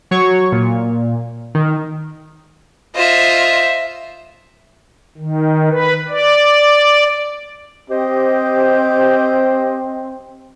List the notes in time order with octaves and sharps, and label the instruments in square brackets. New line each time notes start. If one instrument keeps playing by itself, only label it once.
[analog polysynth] F#3 C#5 C#6
A#2
D#3
[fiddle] F4 D#5 [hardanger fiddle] C5 E5
[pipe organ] D#3
B4
D5
[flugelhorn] C4 [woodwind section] G4 C5 D#5